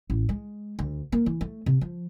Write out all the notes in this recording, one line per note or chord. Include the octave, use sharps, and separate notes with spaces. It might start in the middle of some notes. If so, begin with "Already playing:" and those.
A1
G#3
D2
A#3
E3
A3
C3
F3